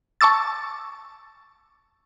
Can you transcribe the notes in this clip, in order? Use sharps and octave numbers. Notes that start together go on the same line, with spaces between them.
A5 C#6 D6 E6 A6